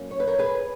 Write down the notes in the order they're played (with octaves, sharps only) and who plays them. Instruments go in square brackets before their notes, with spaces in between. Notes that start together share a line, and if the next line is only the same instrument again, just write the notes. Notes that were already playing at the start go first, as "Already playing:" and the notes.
Already playing: [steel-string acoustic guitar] F#3 A#3 C#4
C#5
B4
A#4 C#5
G#4 B4